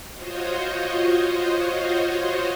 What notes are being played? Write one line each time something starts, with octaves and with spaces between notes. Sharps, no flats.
F4 F#4 C5 C#5 D#5